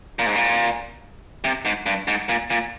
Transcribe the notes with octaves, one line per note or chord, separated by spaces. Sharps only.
A#2
G#2
A#2
C3
G#2
G2
G#2
A#2
A#2